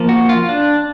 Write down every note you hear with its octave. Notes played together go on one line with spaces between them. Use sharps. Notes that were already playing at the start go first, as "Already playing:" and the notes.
Already playing: F3 A#3
F#4
F4
D4